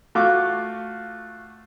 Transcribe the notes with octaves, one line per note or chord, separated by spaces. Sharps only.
A3 F4 F#4 D6